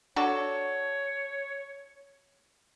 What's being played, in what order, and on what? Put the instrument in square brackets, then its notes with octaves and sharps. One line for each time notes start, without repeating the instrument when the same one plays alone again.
[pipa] D4 F#4 A4 [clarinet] C#5